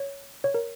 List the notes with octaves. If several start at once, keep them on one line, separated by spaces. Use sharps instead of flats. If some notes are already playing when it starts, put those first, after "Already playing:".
Already playing: C#5
C#5
A#4